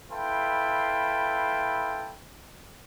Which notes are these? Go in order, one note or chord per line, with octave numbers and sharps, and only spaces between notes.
E4 A4 B4 F5 G5 C6